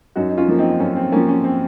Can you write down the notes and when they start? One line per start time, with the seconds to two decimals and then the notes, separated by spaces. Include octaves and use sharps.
0.16 F#2 D#4 F#4
0.30 D#4
0.37 C#4 F4
0.48 F3 A#3
0.58 C4 D#4
0.71 D#4
0.80 F#2 C#4
0.96 C4
1.12 F3 A#3 C#4
1.28 C#4
1.44 C4